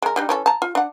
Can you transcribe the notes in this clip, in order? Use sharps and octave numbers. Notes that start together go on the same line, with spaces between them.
G#3 A#4
G3 D4 D#4
E3 C#4 A4
A5 A#5
F4
D4 F#5